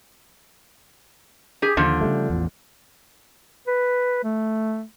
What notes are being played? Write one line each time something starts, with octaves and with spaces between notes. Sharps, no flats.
G4 G#4
D#2 D3 F3
C#3 G3 A3
A1 E2
B4
A3